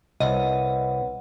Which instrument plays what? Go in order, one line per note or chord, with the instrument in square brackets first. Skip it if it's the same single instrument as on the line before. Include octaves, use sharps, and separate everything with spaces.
[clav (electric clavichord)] C2 [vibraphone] B4 C#5 F#5 [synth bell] D#5